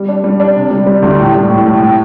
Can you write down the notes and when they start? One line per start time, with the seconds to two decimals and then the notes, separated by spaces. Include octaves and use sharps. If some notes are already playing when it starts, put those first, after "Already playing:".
Already playing: G3
0.08 D4
0.24 G3
0.40 D4
0.55 C3
0.71 G3
0.86 G3
1.02 D2
1.19 A2
1.35 G3
1.50 A2
1.66 A2
1.81 A2